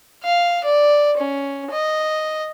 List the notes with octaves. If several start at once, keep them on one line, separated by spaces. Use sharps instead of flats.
F5
D5
C#4
D#5